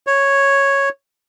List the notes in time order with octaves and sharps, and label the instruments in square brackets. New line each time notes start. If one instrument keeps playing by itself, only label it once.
[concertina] C#5